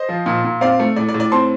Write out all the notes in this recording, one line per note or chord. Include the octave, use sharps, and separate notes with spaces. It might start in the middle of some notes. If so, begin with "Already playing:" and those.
Already playing: C5 D#5
F3
A#2
A#2
C4 D5 F5
A3
A2 D5
D5
A2
D5
C4 A5 C6